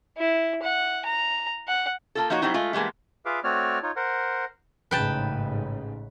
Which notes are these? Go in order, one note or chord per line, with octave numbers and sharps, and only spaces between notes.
E4
F#5
A#5
F#5
A#3 F4 A4
F3 A#3 D#4 F#4 C#5
F#3 G3 A3 C4 D#4 E4
G#3 A3 F4
E3 G3 G#3 A#3 B3
F4 G#4 B4 E5 F5 D6
A3 C4 F#4 C#5 D5 F6
D#4 F4 C#5
A#4 C5 F#5
A1 G#2 C#3 B4 G5 A5